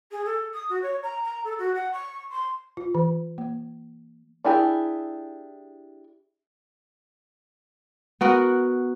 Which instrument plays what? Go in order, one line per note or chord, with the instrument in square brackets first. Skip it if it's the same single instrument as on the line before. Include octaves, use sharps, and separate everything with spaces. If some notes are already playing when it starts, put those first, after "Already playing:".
[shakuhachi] G#4
A4
D#6
F#4
C#5
A#5
A#5
A4
F#4
F#5
C#6
C6
[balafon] F4
E3
A#3
[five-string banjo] D4 E4 G4 G#4
[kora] B3 F#4 A#4